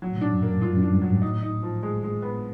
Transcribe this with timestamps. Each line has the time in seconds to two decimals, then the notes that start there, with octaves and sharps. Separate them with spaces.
0.02 F#3
0.10 A2
0.17 A#2 D4
0.32 F#2
0.42 F#2 A#3
0.61 G2 F4
0.77 F#2
0.82 D4
0.91 G2
1.02 G#2 F#3
1.22 A2 D#4
1.43 D#4
1.63 F3
1.83 G#3
2.03 G#3
2.22 B3